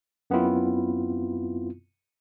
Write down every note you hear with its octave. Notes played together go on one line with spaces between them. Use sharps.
F#2 B3 C4 E4 F4